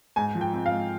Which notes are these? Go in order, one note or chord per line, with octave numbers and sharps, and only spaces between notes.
G#2 G#5
F3
G5
C4
F5
G#2